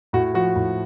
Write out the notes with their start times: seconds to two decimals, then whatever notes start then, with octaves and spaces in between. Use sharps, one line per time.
0.13 A2 F#4
0.34 F3 F#4
0.56 A2